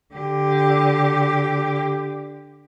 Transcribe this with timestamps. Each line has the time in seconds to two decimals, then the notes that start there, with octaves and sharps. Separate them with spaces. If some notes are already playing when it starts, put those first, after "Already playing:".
0.15 D3 G4